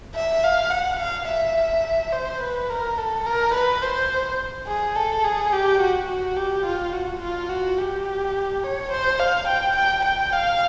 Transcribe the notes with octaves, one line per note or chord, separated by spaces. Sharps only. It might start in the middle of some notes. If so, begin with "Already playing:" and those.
E5
F5
F#5
F5
E5
C5
B4
A#4
A4
A#4
B4
C5
G#4
A4
G#4
G4
F#4
F#4
G4
F4
F#4
F4
F#4
G4
C#5
C5
F5
G5
G5
G5
F5